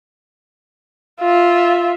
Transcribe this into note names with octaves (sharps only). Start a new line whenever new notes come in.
F4 E5